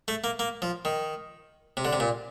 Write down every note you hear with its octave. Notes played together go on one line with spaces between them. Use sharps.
A3
A#3
A#3
F3
D#3
C3
D3
C3
A#2